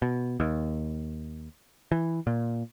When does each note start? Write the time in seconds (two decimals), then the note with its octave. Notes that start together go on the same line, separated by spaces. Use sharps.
0.02 B2
0.40 D#2
1.92 E3
2.27 A#2